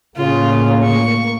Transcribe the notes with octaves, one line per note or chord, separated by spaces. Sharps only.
A2 C#3 A#3 F4
C#6